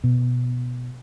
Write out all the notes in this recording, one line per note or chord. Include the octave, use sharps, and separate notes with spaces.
B2